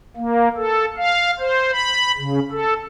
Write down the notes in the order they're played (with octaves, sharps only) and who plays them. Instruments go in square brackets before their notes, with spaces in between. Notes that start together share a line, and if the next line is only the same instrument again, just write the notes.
[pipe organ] A#3
A4
F5
C5
B5
C#3
A4